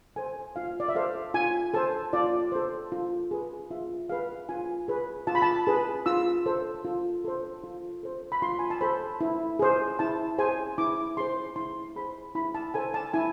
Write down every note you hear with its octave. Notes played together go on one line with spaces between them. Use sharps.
A4 C5 G#5
F4 F5
D5
E5
A4 C5 F5
F4 G#5
A4 C5 A5
F4 D5
A4 C5
F4
G#4 B4
F4 E5
G#4 B4 F5
F4 G#5
G#4 B4
F4 A5
B5
A5
G#4 B4
F4 E6
A4 C5
F4
A4 C5
F4
A4 C5
B5
F4 C6
G#5
A5
A4 C5 B5
E4
G#4 C5
E4 A5
G#4 C5 G#5
E4 D6
G#4 C5 C6
E4 C6
G#4 C5 B5
E4 B5
A5
A4 C5 G#5
A5
E4 G#5